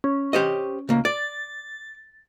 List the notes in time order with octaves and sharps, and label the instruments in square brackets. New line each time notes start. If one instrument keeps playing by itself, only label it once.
[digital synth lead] C#4
[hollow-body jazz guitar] G4 C5 D#5
C#2 A#3
[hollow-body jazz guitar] D5 [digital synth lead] A6